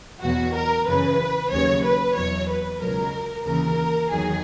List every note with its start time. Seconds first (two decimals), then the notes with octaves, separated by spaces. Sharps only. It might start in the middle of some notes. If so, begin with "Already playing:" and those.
0.21 E2 B2 F#3 F#4
0.55 A#4
0.86 F#2 C#3 E3 B4
1.51 D#2 C#3 F#3 C#5
1.83 B4
2.16 E2 B2 F#3 C#5
2.48 B4
2.80 C#2 B2 F#3 A#4
3.45 D#2 C#3 E3 A#4
4.10 E2 D#3 F#3 G#4